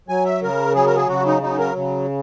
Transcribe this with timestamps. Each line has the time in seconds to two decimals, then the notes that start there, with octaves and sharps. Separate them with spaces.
0.08 F#3 G#5
0.25 E5
0.42 C#3 A#4
0.75 F#3 G#4
0.86 A#4
0.96 G#4
1.08 C#3 F#4
1.26 D#4
1.42 F#3 D#4
1.59 A#4
1.76 C#3